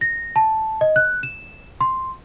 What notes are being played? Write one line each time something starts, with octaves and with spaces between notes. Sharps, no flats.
A#6
A5
D#5
F#6
E7
C6